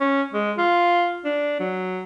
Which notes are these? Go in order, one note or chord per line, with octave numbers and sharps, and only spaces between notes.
C#4
G#3
F4
D4
F#3